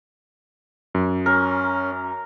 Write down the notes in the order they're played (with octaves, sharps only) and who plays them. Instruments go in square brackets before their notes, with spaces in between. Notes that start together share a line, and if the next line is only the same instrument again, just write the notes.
[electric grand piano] F#2
[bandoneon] C#4 [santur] A#4